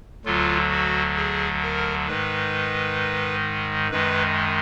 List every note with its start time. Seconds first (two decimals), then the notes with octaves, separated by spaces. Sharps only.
0.25 D2 D3 F#3 F4
0.71 F#4
1.16 G#4
1.62 A#4
2.08 G#2 D#3 G#3 B4
3.91 F#2 D#3 G#3 B4